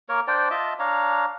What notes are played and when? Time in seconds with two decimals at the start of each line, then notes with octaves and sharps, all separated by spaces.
0.09 A#3 A#4 C#5
0.27 D4 C5 D5 G5
0.51 F4 D#5 E5 A5
0.79 D4 C#5 F5 A#5